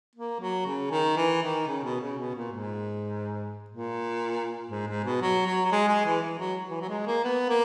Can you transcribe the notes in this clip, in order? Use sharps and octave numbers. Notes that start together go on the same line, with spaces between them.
A#3
F#3
C#3
D#3
E3
D#3
C#3
B2
C#3
B2
A#2
G#2
A#2
G#2
G#2
B2
F#3
F#3
F#3
G#3
G#3
E3
E3
F#3
E3
F#3
G#3
A#3
B3
A#3